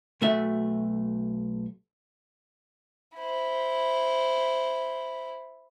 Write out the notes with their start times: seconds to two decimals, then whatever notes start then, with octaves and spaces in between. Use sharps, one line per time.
0.22 B1 A3 F#4 E5
3.17 E4 C5